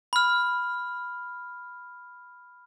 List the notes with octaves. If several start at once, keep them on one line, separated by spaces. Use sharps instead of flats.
B5 F6